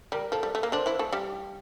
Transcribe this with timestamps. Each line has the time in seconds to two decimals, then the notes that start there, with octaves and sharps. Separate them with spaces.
0.12 G3 A#4
0.32 F3 A4
0.43 G3
0.55 A3
0.63 A#3
0.72 D3 D4 C5
0.86 E3 E4
0.99 A3 A4
1.13 G3 G4